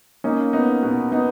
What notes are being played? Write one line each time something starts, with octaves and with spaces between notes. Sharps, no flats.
A#3 C#4 D#4
B3 D#4
B2 B3
B3 D#4